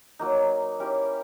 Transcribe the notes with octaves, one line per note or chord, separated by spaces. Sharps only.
F#3 A#3 D#4
C#4 E4 G4 A#4